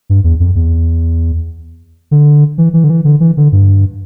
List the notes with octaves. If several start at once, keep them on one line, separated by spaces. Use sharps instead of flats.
G2
E2
F2
E2
D3
E3
E3
D3
E3
D3
E3
D3
G2